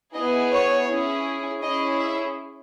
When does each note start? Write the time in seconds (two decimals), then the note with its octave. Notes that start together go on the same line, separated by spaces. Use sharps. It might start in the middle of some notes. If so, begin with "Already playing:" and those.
0.15 B3 E4 G#4 D#5
0.52 C#5
0.88 C#4 E4 G#4
1.62 C#4 E4 G#4 D#5
2.00 E5